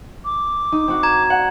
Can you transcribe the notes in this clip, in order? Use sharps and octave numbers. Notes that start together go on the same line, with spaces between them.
D6
D#4
C4 F#4
A#5 G#6
D5 F#5